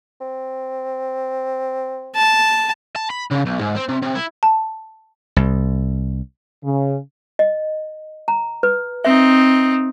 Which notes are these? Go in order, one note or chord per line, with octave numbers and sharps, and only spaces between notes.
C4
A5
A5
B5
C#3
B1
G#2
C4
C3
C3
E4
A5
C2
C#3
D#5
A#5
B4
C4 D#4 E5